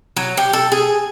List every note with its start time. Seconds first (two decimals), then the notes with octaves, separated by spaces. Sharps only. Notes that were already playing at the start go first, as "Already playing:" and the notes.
0.16 F#3
0.37 G4
0.53 A4
0.72 G#4